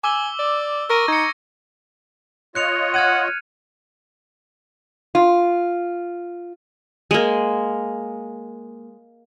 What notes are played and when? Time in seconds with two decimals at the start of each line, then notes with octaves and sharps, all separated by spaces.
0.04 G#5 D6 E6 G7
0.39 D5
0.90 A#4 C#6 A#6 D#7
1.08 D#4 G#6 C#7
2.55 F4 C#5 D#5 F#6 C#7 F7
2.94 F#5 F6 G#6 D#7
5.15 F4
7.11 G#3 A#3